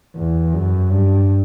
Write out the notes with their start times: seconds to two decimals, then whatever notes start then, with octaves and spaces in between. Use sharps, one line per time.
0.16 E2
0.54 F#2
0.91 G2